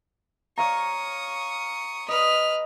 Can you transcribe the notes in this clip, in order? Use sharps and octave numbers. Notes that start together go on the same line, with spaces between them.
C#5 F5 A#5 C#6 D#6
B4 D#5 F6